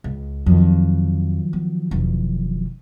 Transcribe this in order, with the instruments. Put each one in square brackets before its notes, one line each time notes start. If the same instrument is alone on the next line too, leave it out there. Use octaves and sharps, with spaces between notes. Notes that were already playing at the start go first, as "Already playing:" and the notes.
[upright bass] C#2
[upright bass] F2 [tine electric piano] D#3 F3 F#3
[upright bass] B3
E1